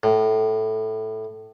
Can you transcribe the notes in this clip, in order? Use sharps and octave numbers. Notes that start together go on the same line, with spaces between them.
A2